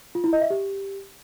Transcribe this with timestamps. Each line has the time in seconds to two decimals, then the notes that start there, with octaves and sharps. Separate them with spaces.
0.15 F4
0.24 E4
0.33 D#5
0.42 E5
0.50 G4